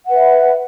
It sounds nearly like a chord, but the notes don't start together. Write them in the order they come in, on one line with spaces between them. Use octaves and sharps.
F#5 B4 E5